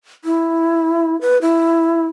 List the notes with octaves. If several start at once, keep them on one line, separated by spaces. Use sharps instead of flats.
E4
B4
E4